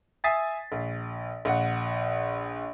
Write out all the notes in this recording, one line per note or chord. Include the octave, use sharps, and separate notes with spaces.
E5 G#5 D#6 A6 B6 C7
A#1
A#1 F#5